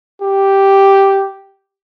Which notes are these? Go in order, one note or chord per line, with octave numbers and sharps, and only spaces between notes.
G4